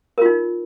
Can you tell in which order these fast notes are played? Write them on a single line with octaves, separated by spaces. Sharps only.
A#4 F4 D#4